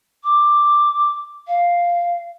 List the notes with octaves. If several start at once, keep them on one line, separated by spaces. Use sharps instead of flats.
D6
F5